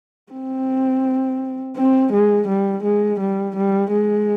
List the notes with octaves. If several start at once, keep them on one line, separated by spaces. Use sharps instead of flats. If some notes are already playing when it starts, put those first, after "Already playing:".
C4
C4
G#3
G3
G#3
G3
G3
G#3